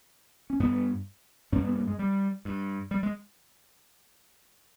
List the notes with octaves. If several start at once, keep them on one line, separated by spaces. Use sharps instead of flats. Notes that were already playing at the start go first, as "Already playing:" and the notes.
C#4
G2 B3
G2 C#4
B3
A#3
G#3
G3
G2
G3
G#3